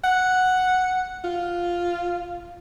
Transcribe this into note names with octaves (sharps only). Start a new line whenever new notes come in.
F#5
F4